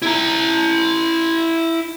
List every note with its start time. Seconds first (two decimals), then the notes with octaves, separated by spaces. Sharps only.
0.02 E4 A#5